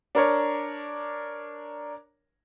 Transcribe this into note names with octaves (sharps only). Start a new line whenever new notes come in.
D4 A#4 C#5